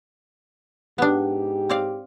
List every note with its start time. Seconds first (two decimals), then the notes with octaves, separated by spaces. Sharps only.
0.98 G#2 B3 D4 G4
1.69 C4 D5 F5